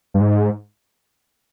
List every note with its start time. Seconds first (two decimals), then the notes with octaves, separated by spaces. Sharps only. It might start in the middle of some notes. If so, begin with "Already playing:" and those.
0.14 G2
0.21 G#2